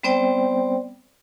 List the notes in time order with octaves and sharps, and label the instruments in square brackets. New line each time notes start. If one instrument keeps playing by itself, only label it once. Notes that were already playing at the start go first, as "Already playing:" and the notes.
[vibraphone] G3 B3 C4 C5 D5 G5